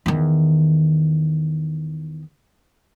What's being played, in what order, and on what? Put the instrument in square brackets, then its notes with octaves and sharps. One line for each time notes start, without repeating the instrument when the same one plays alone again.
[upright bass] E2 D#3